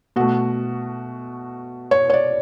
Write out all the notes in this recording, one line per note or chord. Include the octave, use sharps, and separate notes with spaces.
B2 A3 F#4
C#5
C#5
D5